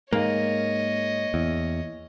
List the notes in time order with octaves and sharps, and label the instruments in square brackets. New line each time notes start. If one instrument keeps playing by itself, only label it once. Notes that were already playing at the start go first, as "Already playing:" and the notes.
[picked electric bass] G#2 [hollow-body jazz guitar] A#3 [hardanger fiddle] C#5 D#5
[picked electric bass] E2